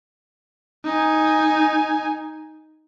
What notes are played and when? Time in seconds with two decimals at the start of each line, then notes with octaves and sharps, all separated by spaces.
0.85 D#4 G#5